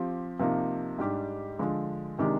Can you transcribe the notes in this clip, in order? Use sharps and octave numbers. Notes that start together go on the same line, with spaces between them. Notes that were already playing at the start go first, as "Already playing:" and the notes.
Already playing: F3 C4 G4
C3 F3 A#3 D#4
G#2 G3 D4 G4
D3 F3 G#3
C3 D#3 G#3 D4 G4